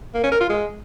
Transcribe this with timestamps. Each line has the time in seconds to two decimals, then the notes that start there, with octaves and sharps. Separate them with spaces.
0.14 A#3
0.23 C#4
0.32 A#4
0.41 F4
0.49 G#3